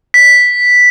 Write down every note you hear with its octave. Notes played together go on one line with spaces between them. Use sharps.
B6